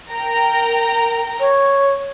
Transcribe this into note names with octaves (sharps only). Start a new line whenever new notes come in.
A#4 G5 A#5
C#5